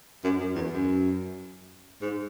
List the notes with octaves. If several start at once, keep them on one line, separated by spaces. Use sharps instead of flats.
F#2
F#2
E2
F#2
G#2